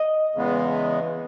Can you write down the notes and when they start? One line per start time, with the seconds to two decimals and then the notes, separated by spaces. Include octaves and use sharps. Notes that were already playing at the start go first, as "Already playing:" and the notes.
Already playing: D#5
0.35 E2 C#3 E3 G#3 B3